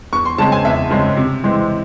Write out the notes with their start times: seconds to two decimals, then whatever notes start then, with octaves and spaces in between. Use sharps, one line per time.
0.13 E2 C#6
0.25 C6
0.38 C#3 G#3 C4 A5
0.52 G#5
0.65 E2 E5
0.90 C#3 G#3 C4
1.17 C3
1.43 E3 G#3 C4